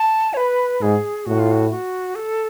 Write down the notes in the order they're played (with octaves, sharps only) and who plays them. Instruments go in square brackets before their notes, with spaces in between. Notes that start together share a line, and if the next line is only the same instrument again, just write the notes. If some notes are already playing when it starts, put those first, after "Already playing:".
Already playing: [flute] A5
C#5
B4
[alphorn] G#2 [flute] G#4
[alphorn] A2 [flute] F#4
[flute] F4
F#4
F#4
A4